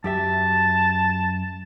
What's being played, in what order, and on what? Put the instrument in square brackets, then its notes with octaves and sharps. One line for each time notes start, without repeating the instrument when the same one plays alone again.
[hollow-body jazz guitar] F#2 G4 E5 [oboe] A5